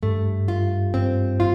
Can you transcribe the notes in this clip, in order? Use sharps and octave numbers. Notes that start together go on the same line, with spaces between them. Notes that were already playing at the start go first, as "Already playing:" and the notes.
G2 A3
F4
C4
F4